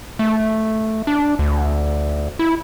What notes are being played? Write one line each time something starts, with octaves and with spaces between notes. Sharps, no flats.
A3
D4
D2
E4